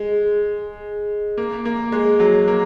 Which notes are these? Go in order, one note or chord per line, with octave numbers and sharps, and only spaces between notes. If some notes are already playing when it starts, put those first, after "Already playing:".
Already playing: G#3
A#3
A#3
G#3
F#3
A#3